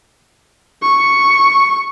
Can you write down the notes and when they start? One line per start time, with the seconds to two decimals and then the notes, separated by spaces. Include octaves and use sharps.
0.82 C#6